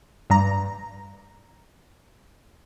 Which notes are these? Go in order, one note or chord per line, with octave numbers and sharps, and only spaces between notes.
G2 A#5